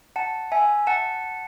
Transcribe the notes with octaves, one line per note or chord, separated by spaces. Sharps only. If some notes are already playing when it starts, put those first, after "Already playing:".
F#5 A5
E5 G#5
F#5 A5